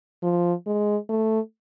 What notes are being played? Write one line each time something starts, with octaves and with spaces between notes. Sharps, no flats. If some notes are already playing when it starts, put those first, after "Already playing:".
F3
G#3
A3